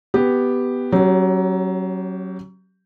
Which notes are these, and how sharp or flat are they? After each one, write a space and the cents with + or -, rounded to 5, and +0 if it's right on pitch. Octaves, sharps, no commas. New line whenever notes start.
B3 +5 G4 +0
F#3 +20 C#4 -20 G4 +0